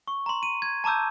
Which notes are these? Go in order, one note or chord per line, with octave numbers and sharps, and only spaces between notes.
C#6
A#5 C6
D#7
G#6
A5 A#5 D6 E6 G6